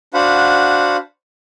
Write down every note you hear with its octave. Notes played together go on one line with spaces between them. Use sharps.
D4 F#4 C5 F5 F#5 B5